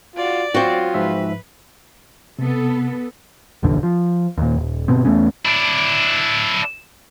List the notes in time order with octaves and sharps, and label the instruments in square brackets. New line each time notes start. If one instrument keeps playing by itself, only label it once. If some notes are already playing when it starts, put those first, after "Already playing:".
[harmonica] F4 F#4 F5 [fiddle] D5
[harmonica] F#3 F4 [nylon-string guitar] C4 F#4
[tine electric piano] G#2 F3 E5 [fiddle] B4
[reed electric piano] C3 [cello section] B3 A4
[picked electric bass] F1 A#1 E2 D3
F3
D#2 A#2
D#1
G1 B2 B3 C4
E2 A3 B3 C#4
[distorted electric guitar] D4 E4